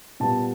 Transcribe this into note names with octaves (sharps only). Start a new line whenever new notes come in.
A#2 G3 B3 A5